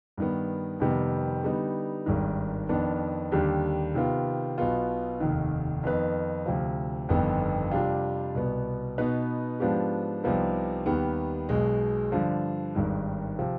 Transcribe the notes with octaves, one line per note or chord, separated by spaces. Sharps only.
G2 D#3 B3
F2 C3 D#3 G3 B3
D3 G3 B3 D#4
G#1 G2 D#3
F2 D#3 B3 D4
D#2 D3 G3 D4 G4
C3 D#3 B3 F4
B1 B2 B3 F4
F1 D#2 D#3
F2 D#3 B3 D#4 B4
D2 C3 F3
G1 F2 D#3 B3
F2 C3 G3 D4 F4
C2 B2 B3
B2 B3 D#4 B4
G#2 F3 B3 D4 G4
C2 C3 F3 B3 D#4
D#2 D#3 G3 B3
B1 B2 G#3
G2 D3 F3
G#1 G2 D#3
C3 F3